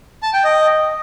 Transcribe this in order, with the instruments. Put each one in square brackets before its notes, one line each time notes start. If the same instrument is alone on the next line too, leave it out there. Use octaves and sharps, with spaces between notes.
[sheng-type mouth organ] A5
G5
D#5